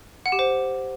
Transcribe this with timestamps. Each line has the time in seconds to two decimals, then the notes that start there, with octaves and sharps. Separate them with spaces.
0.26 F#5
0.32 G4
0.39 C5